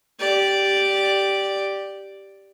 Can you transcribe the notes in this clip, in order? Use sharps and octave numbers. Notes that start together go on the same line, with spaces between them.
G4 D5